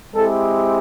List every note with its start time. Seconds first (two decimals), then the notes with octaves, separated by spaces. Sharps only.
0.14 G#3 C4 E4 G4 A4